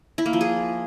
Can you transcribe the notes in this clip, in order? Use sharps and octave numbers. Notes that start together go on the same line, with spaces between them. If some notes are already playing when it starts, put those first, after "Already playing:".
E4
A#3
F3
G#4